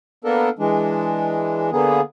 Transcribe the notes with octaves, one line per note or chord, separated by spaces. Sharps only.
A#3 B3 D4 A4 A#4
E3 G#3 D4
D3 A#3 B3 G#4